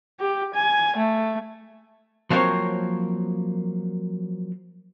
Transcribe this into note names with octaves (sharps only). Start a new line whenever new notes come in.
G4
G#5
A3
F3 F#3 A#3 C4 A#4 C#5